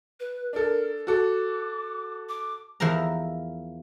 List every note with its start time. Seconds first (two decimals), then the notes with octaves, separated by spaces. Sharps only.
0.20 B4
0.53 D4 A4 A#4
1.07 F#4 A4 D6
2.29 D6
2.80 E2 F3 E4 A#4 A#5